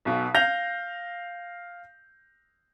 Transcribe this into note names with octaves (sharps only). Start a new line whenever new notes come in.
B1 B2
F5 G6 A#6 F7